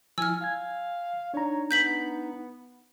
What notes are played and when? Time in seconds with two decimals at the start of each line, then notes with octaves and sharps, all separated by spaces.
0.18 F3 E4 G#5 E6 F6
0.41 F5 G#5 G#6
1.34 D4 D#4 C#5 A#5
1.71 B3 G6 B6 F#7